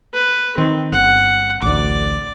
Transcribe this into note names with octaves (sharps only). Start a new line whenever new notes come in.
B4
D#3 C4
G1 F#5
A1 D2 D5 D6